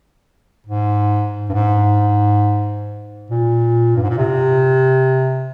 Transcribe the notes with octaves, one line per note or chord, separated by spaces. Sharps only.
G#2
G2
G#2
A#2
G2
G#2
A#2
C3